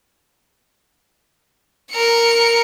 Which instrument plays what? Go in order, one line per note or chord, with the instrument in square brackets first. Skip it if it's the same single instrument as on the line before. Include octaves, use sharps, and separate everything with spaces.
[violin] A#4 C#7